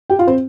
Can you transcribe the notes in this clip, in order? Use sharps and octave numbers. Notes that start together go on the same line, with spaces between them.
G4 G5
F4 F5
C4 C5